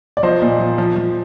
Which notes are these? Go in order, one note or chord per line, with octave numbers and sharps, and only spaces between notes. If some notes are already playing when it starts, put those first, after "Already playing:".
D5
F3 C5 D#5
A#2
F3
F3
F3